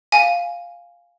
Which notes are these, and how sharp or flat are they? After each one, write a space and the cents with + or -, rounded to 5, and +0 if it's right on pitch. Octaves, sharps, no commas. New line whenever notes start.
F5 +0 G#5 -5